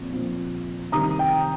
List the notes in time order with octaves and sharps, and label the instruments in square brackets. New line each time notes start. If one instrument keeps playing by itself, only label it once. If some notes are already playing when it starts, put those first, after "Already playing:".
Already playing: [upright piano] A#2 F3 C4
A#2 F3 C4
C3 D#3 G3 A#5 D#6
G5